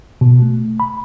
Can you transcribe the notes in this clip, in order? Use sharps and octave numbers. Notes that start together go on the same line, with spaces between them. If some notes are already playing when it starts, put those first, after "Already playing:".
B2
A3
B5